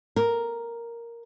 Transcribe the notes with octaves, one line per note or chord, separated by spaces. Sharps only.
A#4